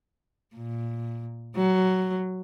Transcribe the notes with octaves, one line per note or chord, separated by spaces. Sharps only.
A#2
F#3